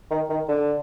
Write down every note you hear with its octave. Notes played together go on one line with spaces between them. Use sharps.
D#3
D#3
D3